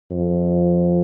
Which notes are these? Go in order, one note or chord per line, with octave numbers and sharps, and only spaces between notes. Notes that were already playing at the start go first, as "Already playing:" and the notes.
F2